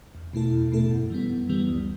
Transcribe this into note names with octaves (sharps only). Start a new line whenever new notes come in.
E2
B2 A3 E4 A4
E2
B2 A3 E4 A4
F#2
E3 G3 B3
F#2
E3 G3 B3
D2